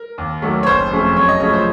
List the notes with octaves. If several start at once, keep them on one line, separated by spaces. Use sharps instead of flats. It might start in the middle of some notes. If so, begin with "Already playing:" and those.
Already playing: A#4
D#2
D#3 F#3 A3
C#5
F#1 C5
F2 C#3 A3 C#4
F#2 C#5
D#5
C#3 F3 A3 C#5
C5